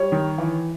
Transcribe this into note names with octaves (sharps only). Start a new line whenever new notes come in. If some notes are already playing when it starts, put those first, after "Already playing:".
Already playing: G3 C#5
D#3
E3